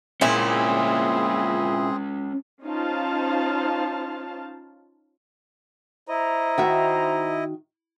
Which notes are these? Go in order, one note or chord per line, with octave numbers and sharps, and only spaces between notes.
A#2 C4 C#4 E4 F4 G#4
C#4 D#4 F4 C5 F5 A5
E4 C5 D#5 A#5
D#3 F#4 E5